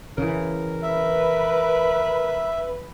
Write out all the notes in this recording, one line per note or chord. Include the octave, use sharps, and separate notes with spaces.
C#3 E3 A#4
B4 E5